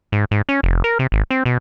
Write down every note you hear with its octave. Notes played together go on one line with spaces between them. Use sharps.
G#2
G#2
C#4
F1
A#4
C3
G#1
C4
B2